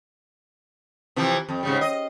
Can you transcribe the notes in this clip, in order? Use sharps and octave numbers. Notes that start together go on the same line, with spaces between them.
C3 E3 F3
F2
G#2 C#3 G3
D#5